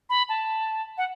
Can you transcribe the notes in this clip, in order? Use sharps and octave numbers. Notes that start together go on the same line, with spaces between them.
B5
A5
F#5